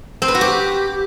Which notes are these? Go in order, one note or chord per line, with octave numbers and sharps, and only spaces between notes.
C4
B4
F#4
G4